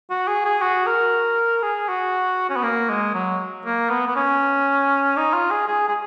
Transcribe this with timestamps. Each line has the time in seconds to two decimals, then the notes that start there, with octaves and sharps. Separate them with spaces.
0.10 F#4
0.28 G#4
0.45 G#4
0.62 F#4
0.87 A#4
1.62 G#4
1.89 F#4
2.50 C#4
2.56 B3
2.63 A#3
2.89 G#3
3.14 F#3
3.65 A#3
3.90 B3
4.07 B3
4.16 C#4
5.17 D#4
5.33 F4
5.51 G#4
5.68 G#4
5.88 G#4